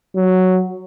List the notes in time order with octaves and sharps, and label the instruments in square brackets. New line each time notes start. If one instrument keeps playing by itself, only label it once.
[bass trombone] F#3